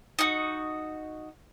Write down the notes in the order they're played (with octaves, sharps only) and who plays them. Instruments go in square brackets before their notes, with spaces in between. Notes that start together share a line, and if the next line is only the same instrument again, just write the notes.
[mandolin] D#4 F#4